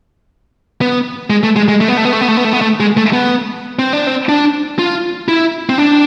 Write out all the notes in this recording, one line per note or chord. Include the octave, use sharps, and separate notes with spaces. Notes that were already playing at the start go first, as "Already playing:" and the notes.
B3
G#3
A3
G#3
G#3
A3
B3
A3
B3
A3
B3
A3
B3
A3
B3
A3
G#3
A3
B3
C4
D4
C4
D4
F4
E4
C4
D4